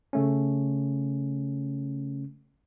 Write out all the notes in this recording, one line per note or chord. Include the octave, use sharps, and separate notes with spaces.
C#3 A3 C#4